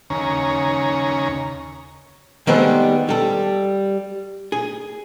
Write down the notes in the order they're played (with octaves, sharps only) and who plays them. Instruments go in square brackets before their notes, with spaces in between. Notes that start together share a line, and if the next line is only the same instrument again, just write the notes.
[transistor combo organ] D#2 C#3 C#4 A#5
[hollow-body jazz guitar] D#3 G3 G#3 B3 C4 A4
G3 A4
G#4